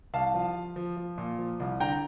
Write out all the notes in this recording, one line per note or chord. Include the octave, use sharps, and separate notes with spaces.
C2 F5 A5
F3
F3
F3
F3
A#2
F3
C2
D3 G5 A#5